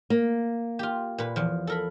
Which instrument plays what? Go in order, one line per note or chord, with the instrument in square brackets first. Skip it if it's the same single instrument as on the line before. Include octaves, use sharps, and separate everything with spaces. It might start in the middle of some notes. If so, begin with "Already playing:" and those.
[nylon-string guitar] A#3
[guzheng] F4 G4
A#2 B4
E2 F3
A4 A#4 B5